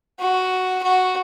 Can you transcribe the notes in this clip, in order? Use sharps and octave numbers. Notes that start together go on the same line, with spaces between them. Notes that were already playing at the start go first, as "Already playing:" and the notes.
F#4
F#4